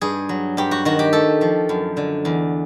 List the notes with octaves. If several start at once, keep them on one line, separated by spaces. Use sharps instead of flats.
G2 G#4
F#3
G2 G4
F#4
D#3 F#4
G4
A3 A4
F3
F#2
D3
E2